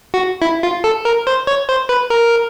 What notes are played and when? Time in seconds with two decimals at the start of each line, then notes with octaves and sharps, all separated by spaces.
0.14 F#4
0.42 E4
0.63 F4
0.84 A4
1.05 A#4
1.27 C5
1.47 C#5
1.69 C5
1.89 B4
2.10 A#4